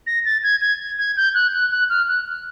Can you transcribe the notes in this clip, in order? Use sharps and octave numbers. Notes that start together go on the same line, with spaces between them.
A#6
A6
G#6
G#6
G#6
G6
F#6
F#6
F#6
F6
F#6